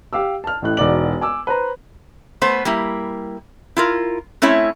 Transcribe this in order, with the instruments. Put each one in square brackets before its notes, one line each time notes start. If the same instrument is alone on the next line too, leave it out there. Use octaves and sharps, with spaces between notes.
[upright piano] G4 F5 D6 E6
A5 F6
A1 A2 F#6
E1 D#4 F#4 D5 D6 F#7
G#5 D6 E6
B4 C5 A#5
[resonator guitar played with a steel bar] A3 B3 B4 C5
G3 A#3 E4
E4 F4 A#4
A3 C4 C#4 E4 C#5